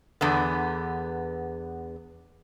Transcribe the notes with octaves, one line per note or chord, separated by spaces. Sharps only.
E2 D3 B3